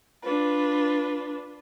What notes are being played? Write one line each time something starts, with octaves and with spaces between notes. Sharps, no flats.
D4 F4 B4